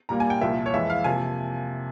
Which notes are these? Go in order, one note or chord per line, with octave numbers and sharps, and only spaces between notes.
A#2 G3 A#3 A#5
G#5
G5
C2 A#2 F3 E5
C#5
F2 E3 G#3 E5
F5
C3 F3 A#3 G#5